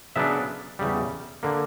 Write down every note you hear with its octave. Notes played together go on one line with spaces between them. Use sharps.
C#3 F#3 B3 D4 E5
E2 C#3 G3
D3 A#3